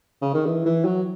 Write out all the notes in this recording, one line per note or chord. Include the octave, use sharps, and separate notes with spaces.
C#3
D#3
E3
E3
F#3